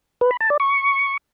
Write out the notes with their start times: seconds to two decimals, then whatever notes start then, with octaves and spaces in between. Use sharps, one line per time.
0.21 B4
0.31 B5
0.40 A5
0.50 D5
0.60 C#6